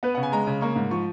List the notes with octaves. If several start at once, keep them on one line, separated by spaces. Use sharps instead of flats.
B3 B4
F#5
C#3
G#5
G#3 A#5
C#3
A#3 C#6
G#2
F3 C#6